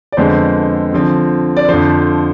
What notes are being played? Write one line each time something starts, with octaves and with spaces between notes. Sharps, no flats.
D5
F2 D3 G#3 B3 C5
D3 F3 C4
D5
F2 D3 F3 C5